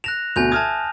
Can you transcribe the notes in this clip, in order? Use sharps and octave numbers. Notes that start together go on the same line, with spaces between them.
F#6 A#6 E7 F7
D2 B2 G#5 G6 F7
E5 A5 D#6 F6 G#6